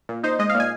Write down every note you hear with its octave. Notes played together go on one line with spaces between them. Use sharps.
A#2
D#4 C5
G#3 D#5
F5
A#2
G#5